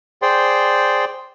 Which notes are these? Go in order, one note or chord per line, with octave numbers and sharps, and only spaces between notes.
G#4 C5 D5 G5 C6